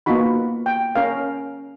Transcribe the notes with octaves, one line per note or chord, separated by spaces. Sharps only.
A#3 B3 D#4 F4 F#4 B5
G5
C#4 A#4 F5